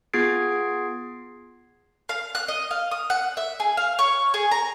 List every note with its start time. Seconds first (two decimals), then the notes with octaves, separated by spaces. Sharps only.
0.13 B3 F4 G#4 G#6 C7 D7
2.09 F5
2.35 F#6
2.48 D#5
2.71 F5
2.91 D#6
3.10 F#5
3.37 E5
3.60 G#4
3.77 F5
3.99 C#5
4.34 G#4
4.51 A#5